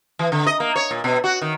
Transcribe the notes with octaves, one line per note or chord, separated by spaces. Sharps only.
E3
D3
D#5
A#3
C#5
A#2
B2
F#4
D#3